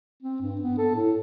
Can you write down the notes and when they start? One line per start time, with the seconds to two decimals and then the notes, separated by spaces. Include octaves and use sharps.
0.23 C4
0.41 G2
0.61 B3
0.78 A4
0.95 A2